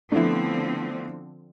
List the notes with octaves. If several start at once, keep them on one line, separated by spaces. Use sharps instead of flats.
D3 F3 A3 B3 C4 D4 E4